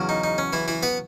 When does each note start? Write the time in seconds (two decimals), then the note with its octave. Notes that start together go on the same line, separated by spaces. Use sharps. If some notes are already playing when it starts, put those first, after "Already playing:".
Already playing: E2 C#3 F#3
0.09 D#4
0.24 D#4
0.38 C#4
0.53 E3 E4
0.68 E3 E4
0.83 B3 B4